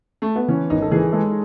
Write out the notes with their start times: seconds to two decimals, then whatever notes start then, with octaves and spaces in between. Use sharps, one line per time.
0.22 A3
0.36 B3
0.48 E3 C#4
0.70 G#1 D#4
0.82 A4
0.91 E3 G#4
1.12 G#3 A4